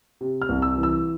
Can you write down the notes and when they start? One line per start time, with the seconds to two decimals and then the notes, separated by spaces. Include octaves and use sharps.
0.21 C3
0.42 F6
0.49 C2
0.62 E6
0.77 E3
0.83 E6